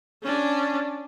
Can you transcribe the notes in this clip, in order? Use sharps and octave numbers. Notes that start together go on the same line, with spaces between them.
C#4 D4